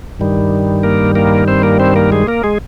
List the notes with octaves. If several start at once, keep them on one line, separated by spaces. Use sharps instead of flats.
G2 D#3 G3
A#3 A#4
A#3 A#4
C4 C5
A#3 A#4
C4 C5
A#3 A#4
G#3 G#4
A#3 A#4
G#3 G#4